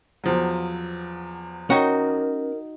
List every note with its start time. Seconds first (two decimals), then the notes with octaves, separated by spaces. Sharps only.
0.24 E2 F3 F#3
1.70 C#4 D#4 F#4 A#4 G5